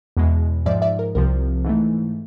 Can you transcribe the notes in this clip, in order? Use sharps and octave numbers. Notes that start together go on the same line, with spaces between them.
E2 B2 G#3
G#2 F3 G#3 D5 E5
D5 E5
A#4
C2 C3 F3 A#4
G#2 E3 A3